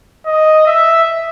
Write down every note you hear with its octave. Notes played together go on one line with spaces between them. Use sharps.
D#5
E5